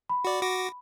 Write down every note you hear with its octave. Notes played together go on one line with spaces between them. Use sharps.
B5
F#4 D5
F#4 D6 A#6